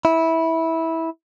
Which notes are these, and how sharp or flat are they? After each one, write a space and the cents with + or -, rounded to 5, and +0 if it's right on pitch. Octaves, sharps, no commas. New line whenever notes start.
E4 -15